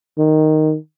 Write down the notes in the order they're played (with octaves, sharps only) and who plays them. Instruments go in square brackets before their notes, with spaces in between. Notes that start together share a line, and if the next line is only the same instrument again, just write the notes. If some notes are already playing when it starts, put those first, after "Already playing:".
[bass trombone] D#3